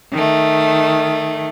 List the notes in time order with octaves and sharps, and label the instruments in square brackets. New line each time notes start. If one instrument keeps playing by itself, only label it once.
[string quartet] D#3 A3